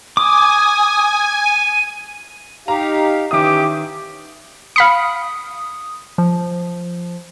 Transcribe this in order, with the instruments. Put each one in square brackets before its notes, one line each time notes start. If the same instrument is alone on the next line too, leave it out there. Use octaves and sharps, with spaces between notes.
[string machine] G#5 [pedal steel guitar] D6 [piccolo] D#6
[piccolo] D#7
[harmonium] D#4 G4 F5 [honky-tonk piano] A#5
[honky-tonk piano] D#3 E5 D#6 [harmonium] E3 [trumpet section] C#4 G4 D6
[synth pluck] F5 B5 C#7 [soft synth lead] D#6
[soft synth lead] F3